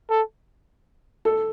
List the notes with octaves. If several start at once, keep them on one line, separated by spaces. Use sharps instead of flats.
A4
A4